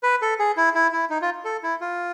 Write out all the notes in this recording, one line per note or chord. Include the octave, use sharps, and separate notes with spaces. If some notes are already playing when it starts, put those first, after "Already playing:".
B4
A4
G#4
E4
E4
E4
D#4
F4
A4
E4
F4